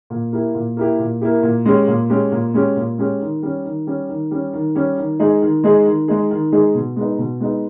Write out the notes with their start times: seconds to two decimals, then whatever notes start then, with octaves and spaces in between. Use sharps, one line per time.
0.10 A#2
0.33 A#3 E4 G4
0.55 A#2
0.77 A#3 E4 G4
0.99 A#2
1.21 A#3 E4 G4
1.43 A#2
1.65 G#3 C#4 G4
1.88 A#2
2.10 G#3 C#4 G4
2.32 A#2
2.54 G#3 C#4 G4
2.76 A#2
2.98 G#3 C#4 G4
3.21 D#3
3.43 G3 C#4
3.64 D#3
3.87 G3 C#4
4.09 D#3
4.31 G3 C#4
4.53 D#3
4.75 G3 C#4
4.98 D#3
5.20 G#3 D#4 G#4
5.42 D#3
5.64 G#3 D#4 G#4
5.86 D#3
6.08 G#3 D#4 G#4
6.30 D#3
6.52 G#3 D#4 G#4
6.75 B2
6.96 G#3 B3 D#4
7.18 B2
7.40 G#3 B3 D#4